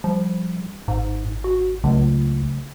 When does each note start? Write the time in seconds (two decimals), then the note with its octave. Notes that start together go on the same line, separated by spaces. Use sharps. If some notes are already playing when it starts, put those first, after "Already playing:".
0.04 F3 G3
0.88 G#1 G#2
1.44 F#4
1.84 C#2 C#3 F#3 A3